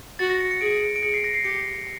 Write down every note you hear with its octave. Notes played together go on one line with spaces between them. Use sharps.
F#4 A6
A#6
C#7
C#7
G#4 D7
D7
G#4 C#7
C7
A#6
C7
G4 C#7